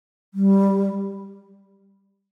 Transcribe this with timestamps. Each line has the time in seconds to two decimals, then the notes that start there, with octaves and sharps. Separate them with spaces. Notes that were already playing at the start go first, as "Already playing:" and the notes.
0.34 G3